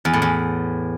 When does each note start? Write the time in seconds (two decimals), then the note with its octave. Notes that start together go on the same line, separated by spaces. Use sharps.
0.05 E2
0.13 A2
0.22 E2